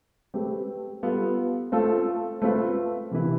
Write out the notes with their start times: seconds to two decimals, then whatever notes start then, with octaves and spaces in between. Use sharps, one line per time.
0.34 A3 C4 G4 B4
1.03 G3 B3 F4 A4
1.72 A3 C4 F4 A4
2.42 A3 C4 F4 B4
3.11 C3 E3 B3 E4 B4